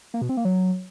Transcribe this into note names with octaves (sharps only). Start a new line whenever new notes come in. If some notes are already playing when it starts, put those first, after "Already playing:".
A#3
B2
C4
A#3
F#3